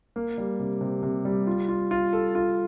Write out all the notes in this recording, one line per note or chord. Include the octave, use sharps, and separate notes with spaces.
A#3
G3
C3
C3
C3
G3
F4
F4
F4
A4
F4